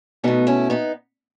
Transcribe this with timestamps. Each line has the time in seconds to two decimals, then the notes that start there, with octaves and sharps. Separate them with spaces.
0.24 B2 A3 B3 D#4
0.47 C#4 E4
0.70 B3 D#4